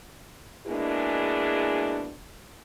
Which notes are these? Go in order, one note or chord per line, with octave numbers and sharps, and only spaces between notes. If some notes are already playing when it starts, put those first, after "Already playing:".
B2 G#3 A#3 D4 E4 G#4